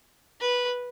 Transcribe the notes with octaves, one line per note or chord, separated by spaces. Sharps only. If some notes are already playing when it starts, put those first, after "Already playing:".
B4